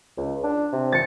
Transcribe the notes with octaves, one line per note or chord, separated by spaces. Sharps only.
C#2
D4
C3
A6 C#7